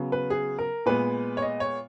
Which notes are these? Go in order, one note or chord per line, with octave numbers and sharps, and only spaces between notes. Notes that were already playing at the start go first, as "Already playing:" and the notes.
Already playing: C#3 F#3 B3
B4
G#4
A#4
A#2 G#3 B3 B4
C#5
D#5
C#5